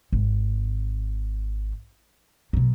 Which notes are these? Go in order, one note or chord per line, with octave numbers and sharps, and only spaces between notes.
G#1
B2 F#3